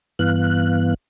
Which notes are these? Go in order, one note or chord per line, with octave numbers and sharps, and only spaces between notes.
G2 E3 B3 F5 F#6